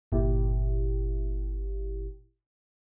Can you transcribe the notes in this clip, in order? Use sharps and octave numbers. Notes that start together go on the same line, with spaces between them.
G1 A#2 E4 G4